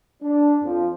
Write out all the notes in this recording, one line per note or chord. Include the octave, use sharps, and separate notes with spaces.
D4
F2 F3